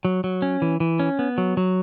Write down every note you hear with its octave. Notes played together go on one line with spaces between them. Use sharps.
F#3
F#3
C#4
E3
E3
C#4
B3
F#3
F#3